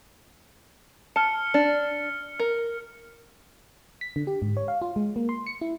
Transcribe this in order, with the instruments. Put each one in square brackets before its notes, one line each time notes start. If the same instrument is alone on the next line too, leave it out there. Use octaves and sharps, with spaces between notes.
[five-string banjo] A5 [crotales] F6 C#7
[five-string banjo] D4
A#4
[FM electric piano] B6
D3
G4
G#2
C#5
F5
F4
G#3
A#3
C6
C#7
E4